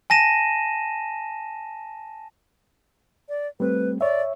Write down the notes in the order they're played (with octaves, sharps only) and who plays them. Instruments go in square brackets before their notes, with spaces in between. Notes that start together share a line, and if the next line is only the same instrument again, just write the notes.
[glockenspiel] G#5 A5 A#6 D#7 E7
[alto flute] D5
[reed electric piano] G3 A3 C4 [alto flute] B4
[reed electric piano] C#5 E5 [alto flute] D5